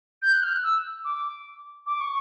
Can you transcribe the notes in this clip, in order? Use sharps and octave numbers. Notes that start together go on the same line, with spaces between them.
G6
F#6
F6
F#6
E6
D6
D6
C#6